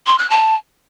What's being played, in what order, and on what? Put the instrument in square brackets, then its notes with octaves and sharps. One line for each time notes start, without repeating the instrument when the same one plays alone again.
[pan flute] C6
F#6
A5